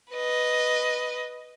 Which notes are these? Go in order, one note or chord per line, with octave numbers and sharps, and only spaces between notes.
B4 D#5